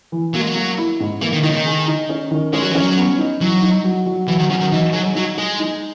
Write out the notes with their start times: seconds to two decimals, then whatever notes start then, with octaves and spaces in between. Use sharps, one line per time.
0.12 E3
0.34 F#3 A#3
0.41 G#3
0.48 F#3
0.56 A#3
0.78 E4
1.00 G#2
1.21 E3 A#3
1.33 D#3
1.43 D#3 D#4
1.49 C#3
1.55 D#3
1.66 G#4
1.87 D#4
2.09 C#4
2.31 D#3
2.53 G#3 C#4
2.62 F#3
2.72 E3 C#4
2.80 F#3
2.97 B3
3.18 D#4
3.41 E3 F#3
3.63 D#4
3.84 F#3
4.06 F#3
4.28 E3 F#3
4.39 D#3
4.50 C#3 F#3
4.61 D#3
4.71 E3 D#4
4.93 F#3 G#4
5.15 F#3 D#4
5.37 G#3 G#4
5.59 D#4